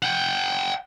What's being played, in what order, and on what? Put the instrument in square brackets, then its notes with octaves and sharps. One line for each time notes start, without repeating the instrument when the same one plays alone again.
[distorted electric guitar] F#5 G5